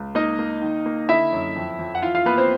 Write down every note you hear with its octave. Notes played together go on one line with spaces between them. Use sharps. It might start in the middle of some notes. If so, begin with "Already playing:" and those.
Already playing: C#2
A#3 D#4 D#5
A#3
D#3
A#3
D3 E4 E5
F#2
F2
F2
F#5
E3 F4 F5
F4 F5
A#3 B3 B4
C4 C5